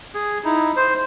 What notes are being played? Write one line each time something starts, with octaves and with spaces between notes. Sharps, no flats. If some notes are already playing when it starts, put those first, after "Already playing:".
G#4
D#4 E4
C5